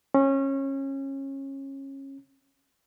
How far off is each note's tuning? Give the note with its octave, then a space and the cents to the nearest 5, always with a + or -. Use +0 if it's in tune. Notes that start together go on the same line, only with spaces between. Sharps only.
C#4 -25